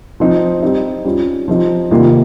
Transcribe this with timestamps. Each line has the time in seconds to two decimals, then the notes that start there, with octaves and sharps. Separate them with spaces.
0.20 F3 C4 D#4
0.63 G3 C4 D#4
1.05 G3 C#4 F4
1.48 F3 C4 D#4
1.91 C3 D#3 G3 A#3 F4